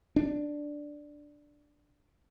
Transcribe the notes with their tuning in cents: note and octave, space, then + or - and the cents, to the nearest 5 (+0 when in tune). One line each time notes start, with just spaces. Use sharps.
D4 +0